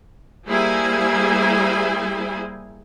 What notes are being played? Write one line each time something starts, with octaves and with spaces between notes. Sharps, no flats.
G3 A#3 E4 G#4 C5 G#5